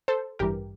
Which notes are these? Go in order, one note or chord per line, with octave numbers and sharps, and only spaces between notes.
A4 C5
A1 G2 E3 G3 G4 A#4